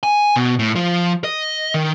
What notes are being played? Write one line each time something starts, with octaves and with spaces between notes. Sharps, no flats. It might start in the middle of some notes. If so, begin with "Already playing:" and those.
G#5
B2
A2
F3
D#5
D#3